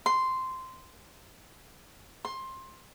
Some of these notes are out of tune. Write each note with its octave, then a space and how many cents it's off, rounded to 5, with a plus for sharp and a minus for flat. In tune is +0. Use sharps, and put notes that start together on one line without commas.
C6 -10
C6 +15